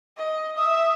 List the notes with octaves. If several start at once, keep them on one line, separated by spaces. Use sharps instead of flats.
D#5
E5 D#6